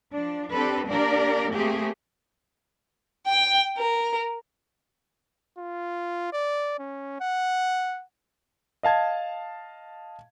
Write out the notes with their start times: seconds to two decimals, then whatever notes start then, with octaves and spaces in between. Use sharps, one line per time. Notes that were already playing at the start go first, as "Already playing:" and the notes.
0.13 F3 D4
0.53 C4 D4 G4 A4 B4
0.89 A#3 D4 G4 A#4 D5
1.54 A3 A#3 C4 G4 G#4
3.27 G5
3.77 A#4
5.58 F4
6.33 D5
6.80 C#4
7.21 F#5
8.83 D#5 F5 A5 G#6